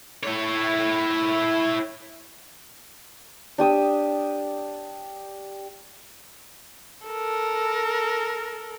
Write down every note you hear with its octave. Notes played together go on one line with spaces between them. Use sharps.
E4 C#5
D4 G4 D#6 E6
A4 A#4